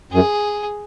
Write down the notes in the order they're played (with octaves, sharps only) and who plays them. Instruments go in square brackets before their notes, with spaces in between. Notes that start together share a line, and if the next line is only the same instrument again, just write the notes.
[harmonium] F#2 [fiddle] G#4